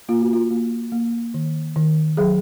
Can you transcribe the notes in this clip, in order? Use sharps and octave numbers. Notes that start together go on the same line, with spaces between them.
A#3 F4
F#4
F4
A#3
A#3
D#3
D#3
F#3 G#4